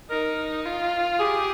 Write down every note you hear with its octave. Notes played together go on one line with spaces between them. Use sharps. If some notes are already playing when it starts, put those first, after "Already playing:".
D#4 A#4
F4
G4 G#4